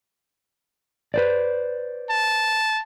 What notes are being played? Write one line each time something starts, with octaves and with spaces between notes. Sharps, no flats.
B4 C5 D5
A5